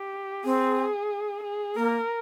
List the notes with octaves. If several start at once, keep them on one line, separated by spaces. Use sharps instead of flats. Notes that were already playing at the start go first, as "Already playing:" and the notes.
Already playing: G4
C4 G#4
G#4
A#3 A#4